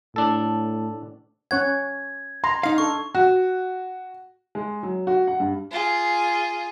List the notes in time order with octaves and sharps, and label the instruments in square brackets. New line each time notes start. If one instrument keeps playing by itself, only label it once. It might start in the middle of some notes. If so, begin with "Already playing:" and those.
[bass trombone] A2 [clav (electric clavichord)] D4 A4
[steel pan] C#4 C#5 F#5 [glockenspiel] G#6
[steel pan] A#5 [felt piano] C6
[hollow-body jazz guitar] D#4 F5
[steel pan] D4 A4 [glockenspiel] C#6
[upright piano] F#4
G#3
F#3
F#4
F#5
G2
[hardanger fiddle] F4 G#4